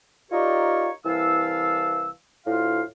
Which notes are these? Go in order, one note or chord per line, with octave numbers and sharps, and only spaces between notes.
D#4 F4 G4 A#4 C#5 D5
C2 E3 F5 A5 E6
D2 A2 F4 F5